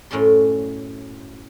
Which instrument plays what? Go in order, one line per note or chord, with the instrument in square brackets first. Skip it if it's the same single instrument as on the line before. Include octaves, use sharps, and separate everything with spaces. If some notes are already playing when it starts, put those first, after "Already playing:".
[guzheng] F#2 A2 C#4 D5 C6